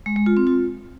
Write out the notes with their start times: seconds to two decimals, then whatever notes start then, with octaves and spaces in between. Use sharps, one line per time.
0.06 G#3
0.16 G#3
0.26 F4
0.37 C4
0.47 F4